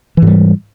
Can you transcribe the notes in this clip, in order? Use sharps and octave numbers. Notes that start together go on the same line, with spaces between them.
G#2 E3 G3